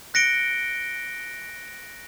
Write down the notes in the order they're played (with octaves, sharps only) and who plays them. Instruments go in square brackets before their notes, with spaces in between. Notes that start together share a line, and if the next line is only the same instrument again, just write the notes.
[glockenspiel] F#6 A#6 C#7 D7 G7